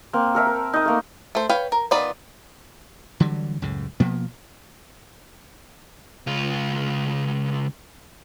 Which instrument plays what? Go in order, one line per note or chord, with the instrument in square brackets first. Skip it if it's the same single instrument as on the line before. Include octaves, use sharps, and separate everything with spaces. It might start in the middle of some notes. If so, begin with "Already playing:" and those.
[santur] A#3 C4
A4 A#4 E5
A#4
D#4 D#6
A3 A#3
[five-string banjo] A3 C5
B4 C#5 F5 G5
A#4
D#3 B3 F4 D5 B5
[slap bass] D3 E3 F#3 G3
C#2 F#2 A2 C#3
B2 F3 A#3 B3
[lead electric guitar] C#2 F4